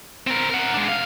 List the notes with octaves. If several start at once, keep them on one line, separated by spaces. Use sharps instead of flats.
C4 A#4
A#4 F#5
G#3 D4
C3 F5